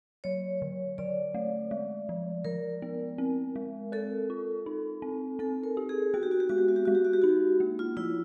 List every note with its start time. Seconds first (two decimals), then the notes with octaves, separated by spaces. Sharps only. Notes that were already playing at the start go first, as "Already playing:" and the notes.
0.24 F#3 C#5
0.62 D3
0.98 D3 D5
1.34 A3
1.71 G#3
2.09 F3
2.45 F3 A#4
2.82 B3
3.18 C4
3.56 G#3
3.92 A4 A#4
4.30 F4
4.66 D#4
5.02 C4
5.39 C4 A4
5.64 A#4
5.77 G4
5.89 G#4
6.14 B3 F#4
6.23 G4
6.31 F#4
6.40 G4
6.49 G#3 F#4
6.58 G4
6.68 F#4
6.76 G4
6.85 G#3 F#4
6.95 G4
7.05 F#4
7.13 G4
7.22 D#4 F#4
7.60 A#3
7.79 F4
7.97 F3 E4